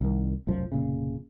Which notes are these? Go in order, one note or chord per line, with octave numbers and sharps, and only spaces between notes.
C2 D#3
F1 B1 F#2 F3
F1 A#2 C#3